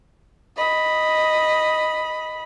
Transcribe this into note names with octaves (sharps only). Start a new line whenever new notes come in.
D#5 B5